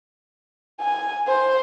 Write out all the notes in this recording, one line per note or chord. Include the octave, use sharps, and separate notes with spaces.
G#5
C5